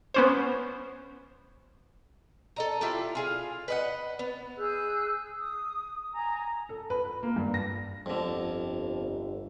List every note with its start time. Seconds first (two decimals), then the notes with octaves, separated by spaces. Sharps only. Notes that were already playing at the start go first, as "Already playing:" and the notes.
0.14 B3 C#4 C5
2.56 A4 D#5 A#5
2.81 E4 F4 G4 A4
3.15 F4 G#4 F5
3.68 B4 D#5 F#5
4.19 B3
4.57 G#4 E6 F#6 G6
5.39 D#6
6.13 G#5 A#5
6.69 A4
6.90 B4
7.05 B4
7.23 A#3
7.36 G2
7.54 A#6
8.06 G1 F2 D3